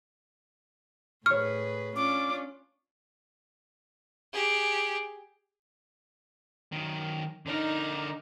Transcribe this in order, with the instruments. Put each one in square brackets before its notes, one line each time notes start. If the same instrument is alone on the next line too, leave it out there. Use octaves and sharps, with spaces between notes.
[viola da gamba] A2 G#4 B4 [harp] C#5 C#6 [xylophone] F6
[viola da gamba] C#4 D4 F4 [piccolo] D6
[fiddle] G4 G#4
[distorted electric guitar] D#3 F#3
[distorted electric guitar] D3 A#4 [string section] D#4